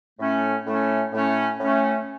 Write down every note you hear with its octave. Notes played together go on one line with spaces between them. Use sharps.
A2 A3 C#4
A2 A3 C#4
A2 A3 C#4
A2 A3 C#4